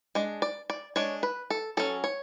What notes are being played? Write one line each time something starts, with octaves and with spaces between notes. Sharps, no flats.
G#3 D4
D5
D5
G#3 D4 C#5
B4
A4
F#3 C#4 A4
C#5